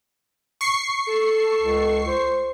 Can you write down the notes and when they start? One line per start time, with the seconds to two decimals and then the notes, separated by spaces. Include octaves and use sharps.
0.61 C#6 C7
1.07 A4
1.60 C#2
2.08 C5